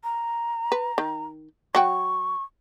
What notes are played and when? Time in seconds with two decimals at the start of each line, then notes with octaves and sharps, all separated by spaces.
0.04 A#5
0.72 B4
0.98 D#3
1.75 F#3 F#4 G5 C#6